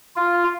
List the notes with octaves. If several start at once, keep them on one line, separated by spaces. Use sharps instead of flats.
F4